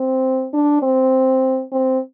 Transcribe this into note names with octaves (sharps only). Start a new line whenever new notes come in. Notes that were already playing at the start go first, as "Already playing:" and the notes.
Already playing: C4
D4
C4
C4